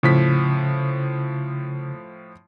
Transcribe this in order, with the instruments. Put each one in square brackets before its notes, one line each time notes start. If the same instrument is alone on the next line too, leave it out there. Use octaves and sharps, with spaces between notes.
[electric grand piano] A2 F3 B6 [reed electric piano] C#3